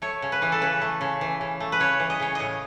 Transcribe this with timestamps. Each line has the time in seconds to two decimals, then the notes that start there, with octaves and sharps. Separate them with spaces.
0.02 A3 C#5
0.22 C#3
0.32 B4
0.42 E3
0.52 A4
0.61 C#3 B4
0.81 A3
1.01 C#3
1.21 E3
1.41 C#3
1.60 A3
1.72 B4
1.80 C#3 C#5
2.00 E3
2.10 D#5
2.20 C#3 C#5
2.35 A2 D#5